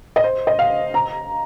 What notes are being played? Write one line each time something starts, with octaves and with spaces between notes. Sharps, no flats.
D#5
C5
D#5
F5
A#5